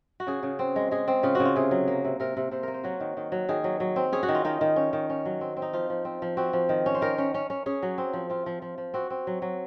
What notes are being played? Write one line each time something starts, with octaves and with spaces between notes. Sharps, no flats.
F#4
C#3 G#4
C#3
C4
G#3
G#3 G#4
C4
C#3 F4
C#3 F#4
F4
C3 G#4
F#3
A#3
C3
C3 A#4
C3
C3 C5
A#3 A#4
C5
F#3 F#4
D#3
D#3
F#3
D#3 G#4
F#3
F#3
C4
C#4 G#4
F#4
D#3
F4
D#3 D#4
D#3
C#4
D#3
C#4
F#3
C4
C4
D#4
F3 F4
F3
C4
F3
C4 F#4
F3
D#3
C#4
C5
D#3 A#4
C#4
C#4
C#4
C#4 G#4
F#3
C4
F3
C4 F4
F3
F3
F3
C4 F#4
C4
F#3
F#3